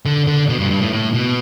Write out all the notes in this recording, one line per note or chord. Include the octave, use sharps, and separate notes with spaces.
D3
D3
B2
G2
G2
A2
A2
B2